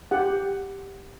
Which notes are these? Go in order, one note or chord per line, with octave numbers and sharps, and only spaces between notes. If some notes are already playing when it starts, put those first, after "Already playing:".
G4 F#5